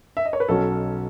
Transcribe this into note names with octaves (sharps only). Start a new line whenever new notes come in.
E5
D#5
C#5
B4
B1 B2 F#3 C#4 A4